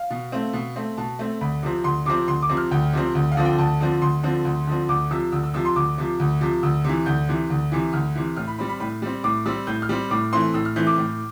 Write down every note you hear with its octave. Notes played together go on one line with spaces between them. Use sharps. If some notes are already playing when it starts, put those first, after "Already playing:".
Already playing: F5
B2
A3 C4
B2
A3 C4
B2 A5
A3 C4
D2 B5
C3 F3 C4
D2 C6
C3 F3 C4 D6
D2 C6
D6
C3 F3 C4
F6
D2 G5
C3 F3 C4
D2
F5
D3 F3 C4
G5
D2 A5
D3 F3 C4
D2 C6
D3 F3 C4
D2
D3 F3 C4
D2 D6
C3 F3 E6
D2 E6
E6
C3 F3 E6
C6
D2 D6
C3 F3
D2
C3 F3
D2 E6
C3 E3
D2 G6
C3 E3
D2
C3 E3
D2 F6
C3 E3
A2 F6
B5
G3 C4 B5
B5
A2 B5
G3 C4
A2 D6
G3 C4 E6
A2 G6
F6
G3 C4
A2 D6
E3 A3 C4 C6
A2 E6
F6
E3 A3 C4 G6
D6
A2